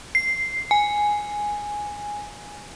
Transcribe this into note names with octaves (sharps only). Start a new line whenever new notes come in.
C7
G#5